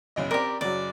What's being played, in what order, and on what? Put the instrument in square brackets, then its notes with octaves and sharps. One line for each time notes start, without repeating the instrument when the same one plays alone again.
[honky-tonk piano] F#1 B1 D#5
[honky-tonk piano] C4 D5 [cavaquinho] G4 A#4
[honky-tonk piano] F#1 F#3 [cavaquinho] D5